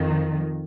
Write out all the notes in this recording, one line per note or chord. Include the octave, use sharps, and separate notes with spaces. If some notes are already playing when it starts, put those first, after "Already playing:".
Already playing: F2 D#3